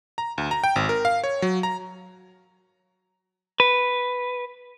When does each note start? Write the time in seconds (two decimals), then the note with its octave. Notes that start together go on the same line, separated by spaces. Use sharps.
0.18 A#5
0.38 D2
0.51 A#5
0.64 G5
0.76 G#1
0.89 A#4
1.05 F5
1.24 C#5
1.42 F#3
1.63 A#5
3.60 B4